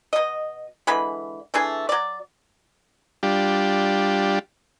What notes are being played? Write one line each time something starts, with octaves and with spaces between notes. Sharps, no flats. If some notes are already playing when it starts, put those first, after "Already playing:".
B2 D#5
D3 E3 G#3 B5
E3 A3 D4 G#4
F#3 D5
G3 D4 F4 G4